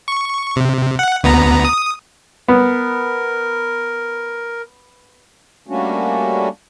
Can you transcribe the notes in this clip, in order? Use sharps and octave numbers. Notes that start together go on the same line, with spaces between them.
C#6
C3
F#5
D2 B3 A#5
D#6
B3 A#4
G3 A3 A#3 C#4 D4 F#4